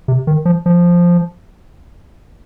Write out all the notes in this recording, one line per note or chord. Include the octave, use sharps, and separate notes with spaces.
C3
D#3
F3
F3